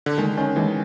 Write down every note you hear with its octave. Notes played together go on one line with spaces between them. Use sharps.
D3
D#3 G#3
D#3 C#4
E3 G#3